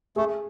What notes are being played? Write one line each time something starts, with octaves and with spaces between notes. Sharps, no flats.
A3 G#4